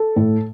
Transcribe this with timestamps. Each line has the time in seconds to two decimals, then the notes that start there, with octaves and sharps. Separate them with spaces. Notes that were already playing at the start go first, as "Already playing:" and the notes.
Already playing: A4
0.16 A2